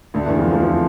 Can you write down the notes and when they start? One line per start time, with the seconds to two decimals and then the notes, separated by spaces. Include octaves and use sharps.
0.14 D2 D3
0.26 E2 E3
0.38 F2 F3
0.50 F2 F3
0.63 F2 F3